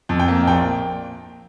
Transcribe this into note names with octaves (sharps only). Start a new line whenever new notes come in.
F2
G5
A#3
A#1 G5